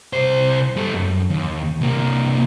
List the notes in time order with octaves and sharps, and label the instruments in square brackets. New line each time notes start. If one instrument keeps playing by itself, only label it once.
[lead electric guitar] C2 C5
G3 A4
F#2
D#2
C2 A#3